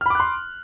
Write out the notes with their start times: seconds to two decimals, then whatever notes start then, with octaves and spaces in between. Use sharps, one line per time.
0.01 F6
0.06 B5
0.10 D6
0.15 F#6
0.20 C6